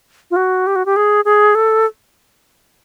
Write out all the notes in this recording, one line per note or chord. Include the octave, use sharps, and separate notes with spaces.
F4
F#4
G4
F#4
G4
G#4
G#4
A4